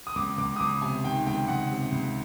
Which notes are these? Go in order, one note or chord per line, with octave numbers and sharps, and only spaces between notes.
D#6
C#2 D6
C#2 D6
D#6
C#2 D6
C3 G#5
D#3 G5
C#2 G5
C#2 F#5
C3
C#2